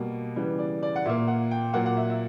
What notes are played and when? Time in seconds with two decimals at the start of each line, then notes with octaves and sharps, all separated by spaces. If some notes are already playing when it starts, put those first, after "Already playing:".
Already playing: B2 G3 A#3
0.36 C#3 E3 G3 B3
0.59 D5
0.83 D5
0.96 F#5
1.05 A#2 A#3 E5
1.28 F#5
1.51 G5
1.73 A#2 F#3 A#3 F#5
1.86 F#5
1.97 E5
2.10 E5